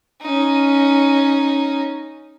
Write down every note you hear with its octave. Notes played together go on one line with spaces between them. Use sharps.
C#4 D#4